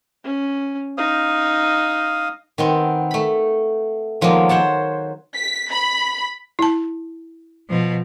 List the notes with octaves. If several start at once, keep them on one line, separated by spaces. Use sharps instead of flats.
C#4
D#4 F5 D#6
D#3 B3 C4
A3 B5
D#3 F3 F#3 G#3 A#3 B3
C5 C#5 F#5 A5
B6
B5
E4 A5
B2 F3